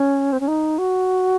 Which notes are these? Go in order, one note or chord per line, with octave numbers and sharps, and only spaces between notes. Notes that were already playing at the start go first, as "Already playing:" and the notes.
Already playing: C#4
C4
C#4
D#4
F#4